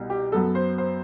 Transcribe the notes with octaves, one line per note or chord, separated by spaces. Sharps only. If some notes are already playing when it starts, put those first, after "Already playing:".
Already playing: C2 B2 G3
G4
F#2 F#3 B3 A4
C5
C5